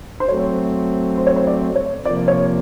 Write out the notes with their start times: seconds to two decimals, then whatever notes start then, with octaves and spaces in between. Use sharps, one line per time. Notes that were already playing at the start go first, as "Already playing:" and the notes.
0.20 C5
0.28 F#3 A3 C4 C#5
1.18 C5
1.27 C#5
1.36 C5
1.47 D5
1.76 C#5
2.05 C3 F3 A#3 D5
2.28 C#5